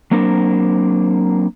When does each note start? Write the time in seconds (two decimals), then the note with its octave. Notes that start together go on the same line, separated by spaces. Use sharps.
0.11 F#3 A#3 C4 D4 A#4